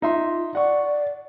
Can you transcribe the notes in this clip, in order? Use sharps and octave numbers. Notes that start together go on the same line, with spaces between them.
D#4 F4 E5 C6
D5 F#5 C#6